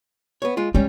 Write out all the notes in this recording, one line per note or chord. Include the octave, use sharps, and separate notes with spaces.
B3 C#5
G#3 F4
G3 G#3 C#4